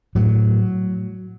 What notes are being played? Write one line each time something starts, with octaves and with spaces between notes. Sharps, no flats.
A2 F#3